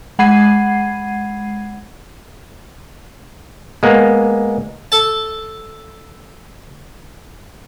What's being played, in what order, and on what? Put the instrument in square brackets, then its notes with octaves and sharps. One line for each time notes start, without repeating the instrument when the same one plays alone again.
[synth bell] G#3 F#5 B5 G#6 C7 D#7
[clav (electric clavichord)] G#3 A#3 B3
[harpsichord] A4 A5